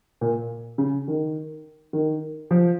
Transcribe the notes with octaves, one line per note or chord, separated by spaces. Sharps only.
A#2
C#3
D#3
D#3
F3